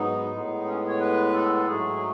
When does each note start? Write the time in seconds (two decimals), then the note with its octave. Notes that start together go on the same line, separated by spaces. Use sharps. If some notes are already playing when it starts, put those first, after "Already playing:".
Already playing: G#2 F#3 B3 D#4
0.32 A2 G#3 B3
0.66 C#4
0.87 C#5
0.99 B4
1.33 A4
1.55 A4
1.66 G#2 F#3 A3 G#4